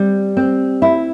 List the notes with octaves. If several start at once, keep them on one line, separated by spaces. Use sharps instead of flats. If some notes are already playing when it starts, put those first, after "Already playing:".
Already playing: G3 C4
C4
E4